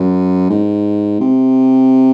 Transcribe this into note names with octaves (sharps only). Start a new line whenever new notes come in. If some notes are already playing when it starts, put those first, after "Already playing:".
Already playing: F#2
G#2
C3